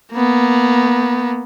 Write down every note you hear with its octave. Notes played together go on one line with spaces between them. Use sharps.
A#3 B3